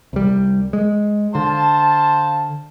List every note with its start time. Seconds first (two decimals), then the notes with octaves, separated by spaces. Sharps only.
0.13 C2 G3
0.73 G#3
1.35 D3 C5 F5 A5